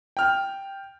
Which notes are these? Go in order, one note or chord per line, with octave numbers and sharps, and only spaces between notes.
G5 F6